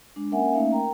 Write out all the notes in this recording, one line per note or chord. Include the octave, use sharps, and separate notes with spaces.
G#3 D4
A#3 C#4 A#4 E5 F#5 G#5
A3 A#3 C#4 D#4 E5 F5
A#4 G5 A#5